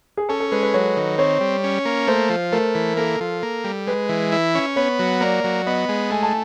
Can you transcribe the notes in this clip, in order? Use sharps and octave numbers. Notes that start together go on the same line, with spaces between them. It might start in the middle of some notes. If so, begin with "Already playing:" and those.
G#4
C#4 A4
A4
G#3 B4
B4
F#3 C#5
D#3
C4 C#5
G3
C#4
A#3
A3 C5
F3
A3 A#4
E3
A#3 A4
F3
A#3
G3
G#3 B4
E3
E4
C#4
B3 C#5
F#3
A#3 D5
F#3
B3 D#5
G#3
A3 G#5
A5